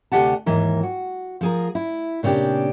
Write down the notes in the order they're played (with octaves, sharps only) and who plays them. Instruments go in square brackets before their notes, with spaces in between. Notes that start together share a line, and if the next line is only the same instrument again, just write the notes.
[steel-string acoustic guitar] D2 C3 C4 G4 F#5 A5
D#2 G#2 E3 A#4
F#4
F3 G#4 A#4
E4
A#2 C#3 C4 D4 G4